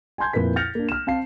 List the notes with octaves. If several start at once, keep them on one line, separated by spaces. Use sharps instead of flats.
G#5 A5 C6 G6 G#6
F2 A#2 E4 A#4 B4 B6
F6 G6 A6 A#6 C#7 F7
A#3 D4
F6 E7
C4 F5 A5 C7